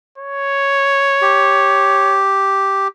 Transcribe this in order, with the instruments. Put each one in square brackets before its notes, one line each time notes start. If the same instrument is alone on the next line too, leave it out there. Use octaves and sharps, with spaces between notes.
[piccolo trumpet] C#5
[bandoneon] G4